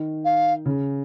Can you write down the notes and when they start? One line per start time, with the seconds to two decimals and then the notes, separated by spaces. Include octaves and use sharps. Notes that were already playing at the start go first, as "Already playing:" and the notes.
Already playing: D#3
0.25 F5
0.66 C#3